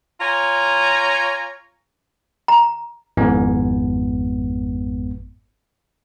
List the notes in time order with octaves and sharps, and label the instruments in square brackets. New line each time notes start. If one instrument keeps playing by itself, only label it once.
[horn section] F4 C#5 G#5 A#5
[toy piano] A#5
[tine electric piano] G#1 F2 G#2 B3